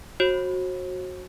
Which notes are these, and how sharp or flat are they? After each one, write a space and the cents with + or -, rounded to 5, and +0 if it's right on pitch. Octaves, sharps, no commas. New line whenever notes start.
F#4 -5 C5 +45